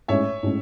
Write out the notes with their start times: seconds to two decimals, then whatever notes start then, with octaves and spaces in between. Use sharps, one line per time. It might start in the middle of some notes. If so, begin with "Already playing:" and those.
0.08 A2 G#3 C#4 C#5 E5
0.43 A2 G#3 C#4